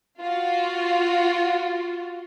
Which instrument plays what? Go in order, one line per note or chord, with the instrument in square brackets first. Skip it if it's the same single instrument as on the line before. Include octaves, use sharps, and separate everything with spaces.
[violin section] F4 F#4